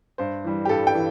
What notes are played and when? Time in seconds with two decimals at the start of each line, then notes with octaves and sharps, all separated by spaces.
0.18 G2 C5
0.44 E3 G3
0.65 G4
0.69 G2 A4
0.87 G5
0.95 E3